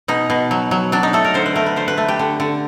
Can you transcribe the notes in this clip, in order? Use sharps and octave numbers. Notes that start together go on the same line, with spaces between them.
B2 D#4
B2
F#3
F#3
F#3 D4
D#4
A3 A4
A#4
D3 C5
B4
A3 A#4
B4
D3 C5
B4
A3
G4
D3
D3